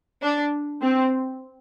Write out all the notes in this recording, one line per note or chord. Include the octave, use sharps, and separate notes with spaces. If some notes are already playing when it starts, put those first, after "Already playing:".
D4
C4